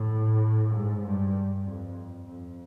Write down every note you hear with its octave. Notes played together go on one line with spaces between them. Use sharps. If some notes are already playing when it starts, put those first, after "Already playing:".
Already playing: A2
G#2
G2
F2
F2